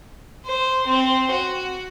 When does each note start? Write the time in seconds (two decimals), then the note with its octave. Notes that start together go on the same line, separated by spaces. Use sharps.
0.45 C5
0.86 C4
1.31 F#4